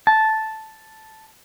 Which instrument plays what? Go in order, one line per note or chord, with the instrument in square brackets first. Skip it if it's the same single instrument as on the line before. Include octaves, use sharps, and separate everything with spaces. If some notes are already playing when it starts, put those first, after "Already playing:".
[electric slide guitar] A5